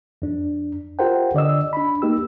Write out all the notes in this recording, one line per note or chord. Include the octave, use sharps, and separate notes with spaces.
F2 D4
F4 G4 A#4 C5 F#5 G5
D3 D5 D#5 E6
D4 B5
A#3 D#4 G4 E6